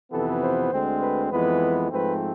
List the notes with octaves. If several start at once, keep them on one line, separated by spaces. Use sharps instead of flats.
F2 C3 E3 B3 A4
C5
D2 D3 G#3 C4
B4
F2 E3 G#3 B3 B4
G#2 F3 A3 C4 B4